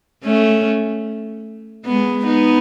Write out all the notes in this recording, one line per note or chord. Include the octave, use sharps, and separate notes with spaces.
A3 C#4
G#3 B3
B3 D#4